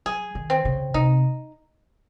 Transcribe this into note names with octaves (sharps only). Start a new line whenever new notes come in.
F#3 G#4
D#3
C4
C#3
C3 D#4